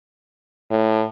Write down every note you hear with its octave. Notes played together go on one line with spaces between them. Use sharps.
A2